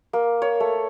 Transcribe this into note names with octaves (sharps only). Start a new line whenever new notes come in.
A#3
C#5
A3